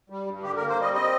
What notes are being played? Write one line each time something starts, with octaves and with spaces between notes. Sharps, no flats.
G3
G2
D3 G4
A#4
A#3
C5
G3 D#5
C4 D#5